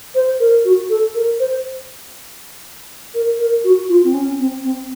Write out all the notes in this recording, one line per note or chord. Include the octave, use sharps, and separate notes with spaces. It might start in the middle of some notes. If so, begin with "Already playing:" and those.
C5
A#4
F#4
A4
A#4
C5
A#4
A#4
F#4
F4
C4
C#4
C4
C4